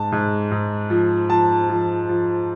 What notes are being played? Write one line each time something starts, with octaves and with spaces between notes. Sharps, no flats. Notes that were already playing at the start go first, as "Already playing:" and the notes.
Already playing: G#2 A5
G#2
G#2
F3
F3 A5
F3
F3